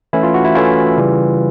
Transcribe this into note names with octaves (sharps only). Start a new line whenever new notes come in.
E3 A3 C#4 E4
F4
F#4
E4
E3 A3 C#4 E4 F4
C#3 E3 G3